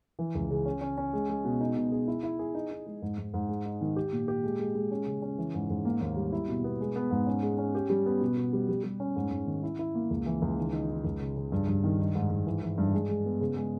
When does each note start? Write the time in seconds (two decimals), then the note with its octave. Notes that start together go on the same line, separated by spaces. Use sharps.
0.19 E3
0.35 C#2
0.50 C#3
0.66 C#4
0.81 C#4
0.98 C#4
1.13 G#3
1.29 G#3
1.45 B2
1.61 D#4
1.77 B2
1.92 G#4
2.08 E4
2.23 E4
2.39 G#4
2.55 D#4
2.71 D#4
2.87 G#3
3.02 G#2
3.18 G#2
3.34 G#2
3.49 G#3
3.66 D#4
3.81 D#3
3.96 G4
4.13 A#2
4.28 G4
4.44 G#3
4.59 G#3
4.75 G#3
4.91 C#4
5.06 C#3
5.22 C#4
5.38 E3
5.54 G#2
5.70 G#2
5.85 A#3
6.01 D#2
6.17 G3
6.32 E4
6.48 B2
6.64 B3
6.80 G#3
6.96 B3
7.11 G#2
7.27 C#4
7.42 G#3
7.58 C#4
7.75 G4
7.90 G3
8.06 B3
8.21 B2
8.37 B2
8.53 G3
8.69 G3
8.84 G3
9.00 C#4
9.16 G#2
9.31 G#2
9.47 D#3
9.63 E4
9.79 E4
9.95 A#3
10.11 C#2
10.26 E3
10.42 C#2
10.58 D#3
10.73 D#4
10.89 D#4
11.05 C#2
11.20 C#3
11.36 C#3
11.52 G2
11.67 G2
11.84 D#3
12.00 D#4
12.15 G#2
12.30 G#2
12.47 E3
12.63 E3
12.78 G2
12.94 G#3
13.09 G#3
13.26 B3
13.40 C#3
13.56 G#3